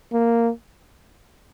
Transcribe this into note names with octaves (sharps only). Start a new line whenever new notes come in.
A#3